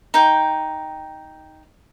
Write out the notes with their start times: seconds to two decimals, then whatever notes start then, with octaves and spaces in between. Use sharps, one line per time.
0.14 D#4 G5